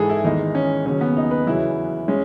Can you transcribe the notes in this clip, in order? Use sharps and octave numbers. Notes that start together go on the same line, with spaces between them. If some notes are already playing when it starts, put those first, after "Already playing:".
Already playing: G#2 E3 G#3 G#4 A4
E4
E2 D#3 G#3 D#4
C#4
D#2 C#3 F#3 C#4
B3
D#4
B4
E2 C#3 F#3 E4
G#3 C#4